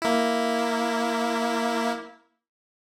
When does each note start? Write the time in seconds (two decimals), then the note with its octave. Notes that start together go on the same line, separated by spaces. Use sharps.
0.02 A#3 E4